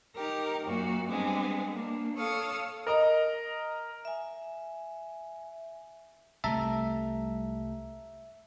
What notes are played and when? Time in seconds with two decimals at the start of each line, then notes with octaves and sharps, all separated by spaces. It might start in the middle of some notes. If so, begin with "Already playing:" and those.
0.16 D#4 G4 A#4 A#5
0.65 F#2 A#2 A#3 F#4
1.08 G3 G#3 B3 C4 D4
1.71 A#3 D4
2.16 A4 C#5 F5 D#6 E6
2.87 A#4 D#5 A#5
4.05 E5 G#5
6.44 C2 G3 A3 E5 A5 A#5